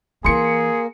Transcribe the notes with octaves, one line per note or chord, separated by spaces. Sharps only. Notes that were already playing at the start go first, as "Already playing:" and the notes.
E3 A#3 E4 G#4 C6 C#7